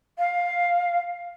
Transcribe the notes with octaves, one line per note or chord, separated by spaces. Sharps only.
F5